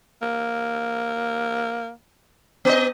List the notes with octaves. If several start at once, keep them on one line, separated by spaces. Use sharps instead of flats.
A#3
B3 D#5